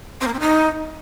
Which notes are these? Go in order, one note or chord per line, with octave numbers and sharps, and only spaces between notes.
C4
A#3
C4
D#4